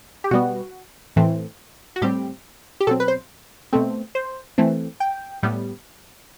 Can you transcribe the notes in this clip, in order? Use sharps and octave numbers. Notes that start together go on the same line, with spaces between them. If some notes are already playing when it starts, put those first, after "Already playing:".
G4
B2 G3 B3 F#4
A2 E3 A3 C4
F#4
A2 G3 C4 G4
G4
B2 F#3 C4 A4
B4
C5
B2 A3 C4
C5
E3 A3 C4
G5
A2 G3 B3